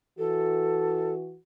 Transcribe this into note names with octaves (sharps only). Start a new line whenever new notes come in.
E3 F#4 A4